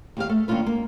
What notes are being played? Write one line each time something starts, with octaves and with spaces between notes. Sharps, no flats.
D#2 G4 F5
A3
D#3 A#3 C#4 D4 F4 B4
A#3